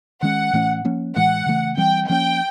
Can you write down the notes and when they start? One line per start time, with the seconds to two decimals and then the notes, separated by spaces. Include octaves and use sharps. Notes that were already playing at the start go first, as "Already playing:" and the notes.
0.22 D#3 G#3 C#4 F#5
0.53 A2 E3 A3 C#4
0.85 F3 A#3 C#4
1.16 A2 E3 G#3 F#5
1.46 C#3 E3 A3
1.77 E3 G3 C4 G5
2.09 F3 A#3 C#4 G5